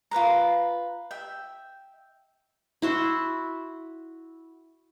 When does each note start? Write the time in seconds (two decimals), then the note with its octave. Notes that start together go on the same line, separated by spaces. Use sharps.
0.11 F4 A4 B4 A#5
1.11 E5 G5
2.82 E4 F#4 E5 C6